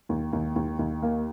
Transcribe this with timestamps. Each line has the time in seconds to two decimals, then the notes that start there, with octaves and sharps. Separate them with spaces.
0.09 D#2
0.33 D#2
0.56 D#2
0.79 D#2
1.02 A#3